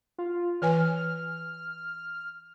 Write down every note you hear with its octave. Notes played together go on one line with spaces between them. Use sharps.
F4
E3 B4 G#5 F6